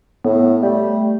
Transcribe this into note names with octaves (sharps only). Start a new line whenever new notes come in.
A2 B3
G3 A3